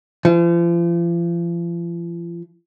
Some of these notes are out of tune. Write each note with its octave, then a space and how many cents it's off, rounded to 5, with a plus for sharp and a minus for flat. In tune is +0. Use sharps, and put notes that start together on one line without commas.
F3 -40